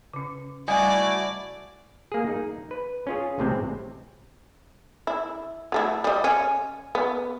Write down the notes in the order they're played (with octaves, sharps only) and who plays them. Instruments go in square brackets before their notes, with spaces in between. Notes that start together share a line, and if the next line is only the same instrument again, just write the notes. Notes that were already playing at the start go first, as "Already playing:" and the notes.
[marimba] C#3 C#4
[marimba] G3 D#5 D#6 [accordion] A3 E4 F#4 [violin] D5 [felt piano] G#5
[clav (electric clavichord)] A#3 G#4
D#4
B4
C#4 F4 G#4
A1 A2 C3 G#3 C4
[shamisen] E4
F#3 A3 E4
G3 D#5
C#4
B3